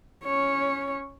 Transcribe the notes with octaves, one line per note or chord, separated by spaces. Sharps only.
C#4 C#5